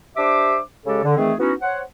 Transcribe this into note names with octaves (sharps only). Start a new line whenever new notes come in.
D4 G4 C5 E5 D6
C#3 G#3 G4 A4
D3
D#3 E3 A3 C4 G#4
B3 C#4 D#4 E4 F#4
C5 C#5 F#5